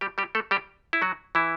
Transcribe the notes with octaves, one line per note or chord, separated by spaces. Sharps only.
G3 G4
G3 G4
A3 A4
G3 G4
E4
F#3 F#4
E3 E4